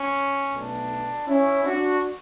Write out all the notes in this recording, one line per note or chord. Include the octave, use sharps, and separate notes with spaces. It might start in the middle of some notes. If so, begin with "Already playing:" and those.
Already playing: C#4
B1 B2 A3 D4
C#4 E4
D4 F#4